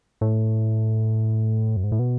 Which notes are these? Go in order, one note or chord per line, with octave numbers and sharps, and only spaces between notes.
A2
F#2
G#2
A2
B2